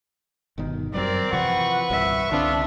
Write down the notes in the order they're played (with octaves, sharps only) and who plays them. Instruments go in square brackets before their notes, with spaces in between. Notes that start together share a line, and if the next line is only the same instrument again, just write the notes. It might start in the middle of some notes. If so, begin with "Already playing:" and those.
[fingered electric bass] G1 B2 D#3
[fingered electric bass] F#2 F#3 G3 [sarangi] C4 [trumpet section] A#4 D5
[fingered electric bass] C3 E3 F3 [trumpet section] B4 C#6 [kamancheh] F#5
[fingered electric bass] D#1 C2 G2 [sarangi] E5
[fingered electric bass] C2 D3 C4 [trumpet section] B3 F4 [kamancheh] D4